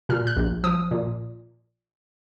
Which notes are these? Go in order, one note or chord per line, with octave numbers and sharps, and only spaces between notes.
A#2 F6
F#6
A#1
F3 D#6
A#2